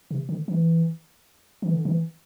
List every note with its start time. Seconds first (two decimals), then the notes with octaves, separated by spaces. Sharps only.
0.11 C3
0.29 D3
0.48 E3
1.62 E3
1.74 D3
1.85 E3